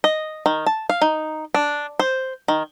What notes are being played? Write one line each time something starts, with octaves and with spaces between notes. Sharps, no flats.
D#5
D#3
A5
F5
D#4
D4
C5
D#3